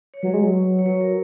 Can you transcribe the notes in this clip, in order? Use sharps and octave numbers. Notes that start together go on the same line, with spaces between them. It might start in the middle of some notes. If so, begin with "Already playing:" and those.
C#5
F#3 B4
G#3
F#3
C#5
F#3 B4
A#4